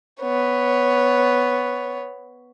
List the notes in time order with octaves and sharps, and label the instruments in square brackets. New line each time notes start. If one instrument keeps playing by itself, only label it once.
[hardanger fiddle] B3 C#5